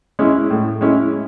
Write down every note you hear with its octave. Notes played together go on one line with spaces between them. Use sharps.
G#3 C#4 E4
A2
G#3 C#4 E4